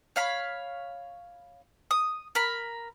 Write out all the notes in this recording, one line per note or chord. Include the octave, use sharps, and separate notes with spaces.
C#5 F5 B5
D#6
A#4 B5